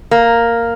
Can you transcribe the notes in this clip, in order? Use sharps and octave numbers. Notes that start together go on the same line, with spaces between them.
A#3